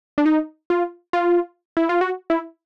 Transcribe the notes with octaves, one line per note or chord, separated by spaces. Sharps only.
D4
D#4
F4
F4
E4
F4
F#4
E4